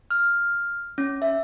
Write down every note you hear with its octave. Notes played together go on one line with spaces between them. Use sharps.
F6
C#4
E5